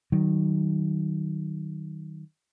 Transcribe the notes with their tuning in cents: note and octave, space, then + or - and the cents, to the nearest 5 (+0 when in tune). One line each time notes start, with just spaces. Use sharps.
D#3 +0 F#3 +35